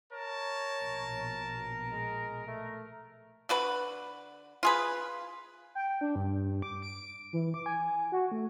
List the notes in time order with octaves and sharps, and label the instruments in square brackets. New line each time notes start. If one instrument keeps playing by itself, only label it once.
[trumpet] A#4 [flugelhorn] C#5 [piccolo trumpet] A5
[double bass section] A#1 B2
[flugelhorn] G#3
A3
[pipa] D3 F#4 B4
F4 G#4 B4
[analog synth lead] G5
D4
G2
D6
D7
E3
D6
G#5
F#4
A3